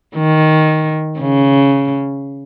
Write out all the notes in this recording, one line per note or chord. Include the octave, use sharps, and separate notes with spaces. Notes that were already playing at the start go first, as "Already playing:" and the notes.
D#3
C#3